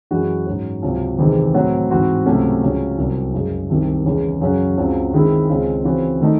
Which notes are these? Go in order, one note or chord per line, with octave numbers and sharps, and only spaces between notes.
F#2 E3 G#3 C#4 F#4
G#2 F#3 C#4
C#2 C3 F#3
E2 C3 D#3 G#3 C4
A2 F#3 C4 F#4 C#5
G#2 E3 C4 F#4 C5
C#2 C3 F#3 A3 C#4
C#2 C#3 F#3 C#4
C2 C3 F#3
F#2 C#3 G#3
C2 C3 D#3
E2 C#3 G#3 C#4
F#2 C#3 F#3 C#4 F#4
C#2 C#3 F#3 C4
D#3 G#3 C4 E4
C#2 C#3 G#3 C4
C#3 E3 C4 F#4 C5
D#3 A3 D#4